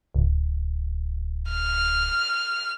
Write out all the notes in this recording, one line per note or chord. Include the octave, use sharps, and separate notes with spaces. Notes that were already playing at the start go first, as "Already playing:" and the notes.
D1
F6